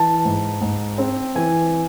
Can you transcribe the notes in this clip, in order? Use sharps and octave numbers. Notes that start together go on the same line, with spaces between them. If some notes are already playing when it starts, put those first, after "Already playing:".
Already playing: E3 A5
G#2
G#2
C4
E3 G#5